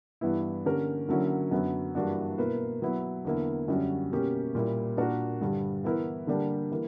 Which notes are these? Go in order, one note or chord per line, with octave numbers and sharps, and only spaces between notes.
G2 E3 B3 E4
D3 A#3 C#4 G4 A#4
D3 F#3 A#3 C#4 E4
F#2 D3 F#3 B3
G2 E3 A#3 D4 F#4
B2 A#3 E4 B4
F#3 B3 E4 B4
E2 D3 A#3 E4
F#2 D3 G3 C#4 F#4
B2 A#3 C#4 G4
A#2 G3 A#3 E4
A#2 A#3 D4 F#4 A#4
G2 D3 G3
E3 B3 E4 A#4
D3 G3 A#3 D4 G4
E3 A#3